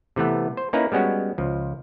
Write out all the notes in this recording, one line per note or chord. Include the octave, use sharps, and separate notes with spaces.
C3 E3 A3 B3
C5
A#3 C#4 D#4 E4 B4 A#5
G3 G#3 B3 C#4 F#4
C#2 F3